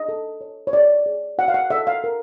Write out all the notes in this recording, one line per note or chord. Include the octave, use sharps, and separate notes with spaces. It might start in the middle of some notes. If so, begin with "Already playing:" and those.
Already playing: D4 D#5
A4
C#5
C#5
G#4 D5
G#4
F#4 F#5
F5
F#5
A4 E5
F5
A#4